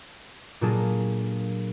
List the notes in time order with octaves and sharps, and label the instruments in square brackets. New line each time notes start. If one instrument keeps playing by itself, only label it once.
[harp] A#2 F#3 A#3 D4 G#4 A4